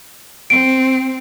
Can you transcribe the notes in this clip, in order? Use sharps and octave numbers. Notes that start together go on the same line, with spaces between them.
C4 D7